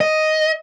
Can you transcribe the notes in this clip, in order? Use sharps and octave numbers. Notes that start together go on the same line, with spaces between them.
D#5